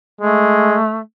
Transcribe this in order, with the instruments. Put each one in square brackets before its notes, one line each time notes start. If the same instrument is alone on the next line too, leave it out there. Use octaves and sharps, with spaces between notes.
[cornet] G#3 [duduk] A3